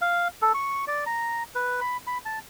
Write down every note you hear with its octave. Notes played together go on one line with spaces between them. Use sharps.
F5
A4
C#6
D5
A#5
B4
B5
B5
A5